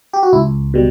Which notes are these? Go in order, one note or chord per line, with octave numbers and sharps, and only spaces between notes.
G4
F#4
C#2 E4
B2 G3